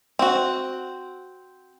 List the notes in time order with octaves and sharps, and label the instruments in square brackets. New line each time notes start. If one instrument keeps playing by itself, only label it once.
[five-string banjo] C4 F#4